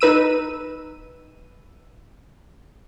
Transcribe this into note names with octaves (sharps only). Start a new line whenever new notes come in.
D#4 B4 E6 D#7